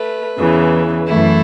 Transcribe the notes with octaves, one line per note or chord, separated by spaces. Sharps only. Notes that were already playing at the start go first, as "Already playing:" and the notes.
Already playing: A3 B4
E2 C#3 E3
F#2 E3 A3 E4